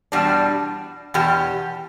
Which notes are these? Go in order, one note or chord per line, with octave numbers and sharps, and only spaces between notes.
E2 B2 G3 D4
E2 B2 G4